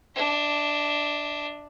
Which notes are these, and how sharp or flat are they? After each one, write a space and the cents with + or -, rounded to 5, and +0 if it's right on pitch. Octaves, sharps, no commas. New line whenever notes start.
D4 +0 E5 -30